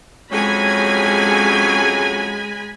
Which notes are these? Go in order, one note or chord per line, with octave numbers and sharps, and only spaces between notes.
F2 F#3 G#3 C#4 G#5 B5